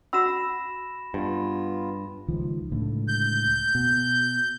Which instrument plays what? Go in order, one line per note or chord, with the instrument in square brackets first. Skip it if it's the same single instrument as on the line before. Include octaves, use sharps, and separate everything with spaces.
[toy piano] F#4 F#5 E6 [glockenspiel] B5 A#6 E7
[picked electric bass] G2 [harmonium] B3 F4
[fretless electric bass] C#2 D#3 F3
C#2 A2 D3
[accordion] G6
[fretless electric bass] B2